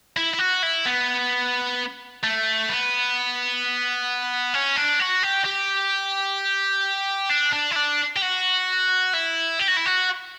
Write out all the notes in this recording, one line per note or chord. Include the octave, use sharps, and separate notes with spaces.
E4
E4
F#4
E4
B3
A3
B3
C#4
D4
F#4
G4
G4
D4
D4
E4
D4
G4
F#4
E4
G4
F#4
E4
F#4